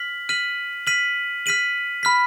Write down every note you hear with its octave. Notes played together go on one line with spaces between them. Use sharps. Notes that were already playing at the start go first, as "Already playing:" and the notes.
Already playing: F6 B6 F#7
F6 B6 D#7 F#7
F6 B6 D#7 F#7
F6 B6 D#7 F#7
B5 F6 B6